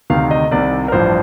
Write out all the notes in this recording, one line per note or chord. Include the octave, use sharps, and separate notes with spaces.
D2 C3 D#3 F5
D#5
C2 C3 D#3 D5
A#4
A1 G2 F3 C5